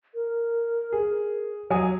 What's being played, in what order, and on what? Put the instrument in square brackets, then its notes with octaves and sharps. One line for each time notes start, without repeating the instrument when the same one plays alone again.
[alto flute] A#4
[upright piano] G#4
F#3 G#5 D#6